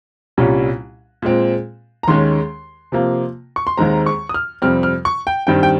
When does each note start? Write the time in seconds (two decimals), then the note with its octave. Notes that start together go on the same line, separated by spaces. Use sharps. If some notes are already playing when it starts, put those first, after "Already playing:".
0.37 C2 A#2 G3 C#4
1.22 A#2 G#3 C4
2.03 A#5
2.08 D#2 D#3 G#3 C#4 C6
2.92 C3 F3 A#3
3.56 C#6
3.67 C6
3.78 D#2 D#3 G#3 C4 A#5
4.06 C#6
4.29 D#6
4.34 F6
4.62 F2 C3 G3 C4 F6
4.83 F6
5.05 C#6
5.27 G5
5.47 G2 D#3 G3 C4 G5
5.63 G5